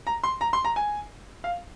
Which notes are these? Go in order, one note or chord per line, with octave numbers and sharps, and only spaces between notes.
A#5
C6
A#5
C6
A#5
G#5
F5